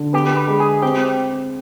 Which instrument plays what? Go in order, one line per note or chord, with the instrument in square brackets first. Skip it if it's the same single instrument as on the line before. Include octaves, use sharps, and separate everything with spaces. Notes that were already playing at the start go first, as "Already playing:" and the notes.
Already playing: [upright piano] D3
[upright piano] B3 [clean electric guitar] G4
[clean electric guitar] B4
[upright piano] G#3
[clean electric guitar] G#4
[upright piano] C4 [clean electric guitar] G4